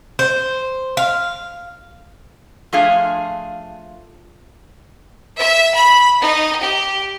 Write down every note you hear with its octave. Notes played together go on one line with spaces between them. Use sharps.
C5
F5
F3 A3 D4 F4 G#4 F5
E5
B5
D#4
G4